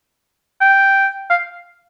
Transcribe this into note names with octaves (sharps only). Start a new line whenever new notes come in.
G5
F5